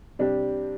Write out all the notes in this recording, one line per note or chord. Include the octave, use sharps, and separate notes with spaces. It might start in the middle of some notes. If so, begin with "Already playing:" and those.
C3 G3 D4 G4